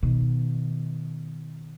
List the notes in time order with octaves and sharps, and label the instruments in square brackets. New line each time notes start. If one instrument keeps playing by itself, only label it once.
[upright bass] B2 D#3